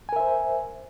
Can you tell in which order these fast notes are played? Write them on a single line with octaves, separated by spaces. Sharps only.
G#5 A#4 E5 C5